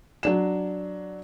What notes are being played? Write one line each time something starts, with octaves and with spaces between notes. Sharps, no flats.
F#3 D4 E7